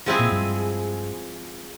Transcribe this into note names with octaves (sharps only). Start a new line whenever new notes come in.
F3 G#3 C4 E4 G#4
A#2
G2